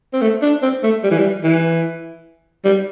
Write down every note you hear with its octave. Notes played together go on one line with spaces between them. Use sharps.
C4
A3
D4
C4
A3
G3
E3
G3
E3
G3